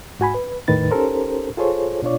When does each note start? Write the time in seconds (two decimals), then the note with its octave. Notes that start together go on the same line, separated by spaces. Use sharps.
0.20 G#2 F#4 G#5 B5
0.34 B4
0.68 E2 A2 D#3 B4 A6
0.91 C#4 D#4 G4 A4 A#4 C5
1.57 F4 G#4 A4 C5 C#5
2.03 B2 D4 F4 C#5 D5